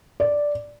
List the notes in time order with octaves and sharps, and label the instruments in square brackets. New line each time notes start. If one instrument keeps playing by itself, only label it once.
[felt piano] D5